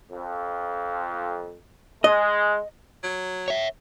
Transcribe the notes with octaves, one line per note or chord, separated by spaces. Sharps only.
F2
G#3 D#5
F#3
C#5 E5